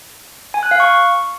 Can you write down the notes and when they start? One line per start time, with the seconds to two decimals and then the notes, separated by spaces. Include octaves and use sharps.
0.54 G#5
0.63 F#6
0.71 F5
0.80 C#6